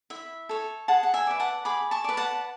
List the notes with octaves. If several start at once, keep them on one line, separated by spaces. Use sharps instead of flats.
E4 E5
A4 C#5
G#4 F#5 A5
F#5
E5 G#5
B4 D5
F#5 A5
G#4 B5 D6
A5 C#6
B4 D5
F#5 A5